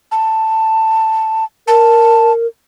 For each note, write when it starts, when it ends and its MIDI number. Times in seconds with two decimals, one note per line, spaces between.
0.11 1.44 81
1.67 2.47 70
1.67 2.32 81